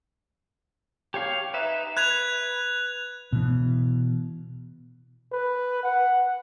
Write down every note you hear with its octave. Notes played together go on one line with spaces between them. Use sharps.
G4 C#5 F5
D#4 B4 E5
B4 F#6 G#6 F7
B2 E3
B4
F#5